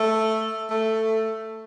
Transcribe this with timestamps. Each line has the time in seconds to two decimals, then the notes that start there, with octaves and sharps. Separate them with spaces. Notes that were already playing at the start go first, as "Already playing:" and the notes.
Already playing: A3
0.70 A3